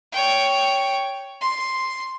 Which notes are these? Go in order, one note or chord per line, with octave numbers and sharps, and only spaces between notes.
C#5 G5
C6